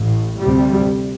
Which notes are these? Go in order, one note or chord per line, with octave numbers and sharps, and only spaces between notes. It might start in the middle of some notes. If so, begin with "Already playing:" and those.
Already playing: A1 A2
D2 C3 G3